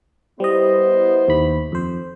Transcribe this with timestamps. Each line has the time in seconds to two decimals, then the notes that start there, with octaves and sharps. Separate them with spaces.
0.40 G3 B3 E4 C5 D#5
1.28 D#2 B5
1.72 F2 C5